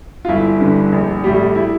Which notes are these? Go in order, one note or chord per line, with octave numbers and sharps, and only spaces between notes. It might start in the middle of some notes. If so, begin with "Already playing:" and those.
F4
G1 E4
G2 D3
A#1
A2 G3
E4